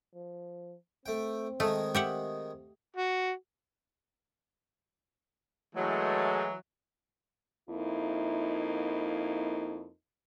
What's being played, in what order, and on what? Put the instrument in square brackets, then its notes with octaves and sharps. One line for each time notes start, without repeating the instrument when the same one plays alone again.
[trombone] F3
[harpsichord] A3 G5 [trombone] C4
[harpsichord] D#3 G#3 D#4 [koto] A3
[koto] G4 E5 F#5
[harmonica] F#4
[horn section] E3 F#3 [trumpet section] G#3 A3
[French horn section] F2 A#3 D#4 E4